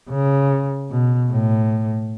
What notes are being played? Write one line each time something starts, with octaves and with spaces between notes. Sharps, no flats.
C#3
B2
A2